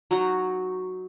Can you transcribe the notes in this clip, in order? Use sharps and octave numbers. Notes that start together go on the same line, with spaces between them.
F#3 D#4 F#4 A#5